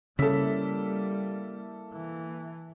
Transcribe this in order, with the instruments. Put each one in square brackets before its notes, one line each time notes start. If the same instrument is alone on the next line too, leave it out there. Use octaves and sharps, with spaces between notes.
[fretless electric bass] C#3 [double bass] G3 [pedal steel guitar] A#3 E4 E5 [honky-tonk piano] A4 B6
[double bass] E3